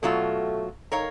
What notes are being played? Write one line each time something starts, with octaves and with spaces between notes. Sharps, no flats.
B2 F#3 A3 F4
D#3 A#4 C#5 F5